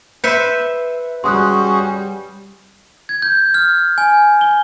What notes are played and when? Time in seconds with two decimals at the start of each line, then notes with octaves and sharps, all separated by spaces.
0.24 B4 C5 E5 G6 C#7
1.24 G3 C#4 F#4 G#4 C6 D#6 F#6
3.09 G#6
3.22 G6
3.54 F6
3.98 G#5
4.41 G7